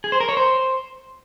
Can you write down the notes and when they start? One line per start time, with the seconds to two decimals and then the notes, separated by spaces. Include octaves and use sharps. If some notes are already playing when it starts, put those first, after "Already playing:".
0.04 G#4
0.12 C5
0.20 A#4
0.29 C#5
0.37 C5